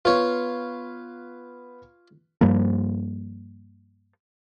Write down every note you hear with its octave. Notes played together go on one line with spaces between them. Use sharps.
B3 F4 B4 C#5
G2 F3 G3 A#3